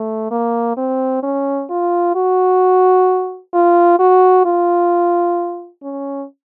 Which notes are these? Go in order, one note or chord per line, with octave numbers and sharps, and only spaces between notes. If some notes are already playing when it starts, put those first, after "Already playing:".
Already playing: A3
A#3
C4
C#4
F4
F#4
F4
F#4
F4
C#4